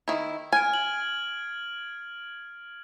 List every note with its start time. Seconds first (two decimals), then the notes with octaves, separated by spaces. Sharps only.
0.08 D#3 E4
0.52 G#5 F6 G#6 D7
0.74 F#7